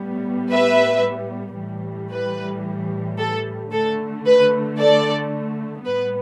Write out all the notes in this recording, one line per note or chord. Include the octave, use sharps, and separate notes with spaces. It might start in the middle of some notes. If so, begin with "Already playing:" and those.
Already playing: A2 G3 B3
B4 E5
A2 E3 G3
B4
A4
D3 A3 A4
B4
A4 D5
A2 G3 B3 B4